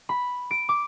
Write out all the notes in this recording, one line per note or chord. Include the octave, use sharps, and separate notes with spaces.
B5
D7
D6